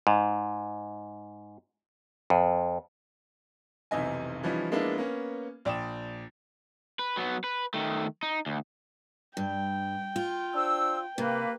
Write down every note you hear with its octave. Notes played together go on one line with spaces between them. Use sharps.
G#2
F2
F1 B1 C3 E3 D#5 G#5
E3 F3 G3 C#4 D#4
F3 G#3 A#3 B3 D4 E4
A#3 B3 C#4
A#1 D5 G5 D#6 E7
B4
F#3 B3
B4
D#3 A3
D#4
D2
G2 G5
F4
D4 C5 E6
C3 A#3 B4